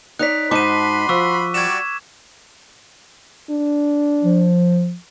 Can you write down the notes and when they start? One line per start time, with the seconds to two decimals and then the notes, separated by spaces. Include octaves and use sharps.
0.19 D#4 C#5 D5 F#6 B6
0.51 G#2 D#4 F#4 A5 B5 C6 D6 D#7
1.09 F3 C#6 E6
1.54 G3 F#4 D5 G#6 E7
3.50 D4
4.23 F3